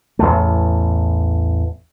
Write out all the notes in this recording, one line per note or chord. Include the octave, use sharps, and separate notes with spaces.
A1 E2 A2 A3